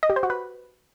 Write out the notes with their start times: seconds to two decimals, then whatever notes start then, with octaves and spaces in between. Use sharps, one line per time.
0.03 D#5
0.10 G4
0.16 C5
0.23 F#4
0.30 B4